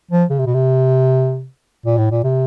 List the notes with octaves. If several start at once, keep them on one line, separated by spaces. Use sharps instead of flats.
F3
C#3
C3
B2
C3
A#2
A2
A#2
C3